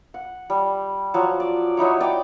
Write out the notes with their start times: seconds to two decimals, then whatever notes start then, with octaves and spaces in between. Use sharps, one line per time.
0.14 F#5
0.50 G3
1.14 F3 F#3
1.40 D5
1.77 F#3 D#4 E4 C#5
2.00 D5 G5 D#6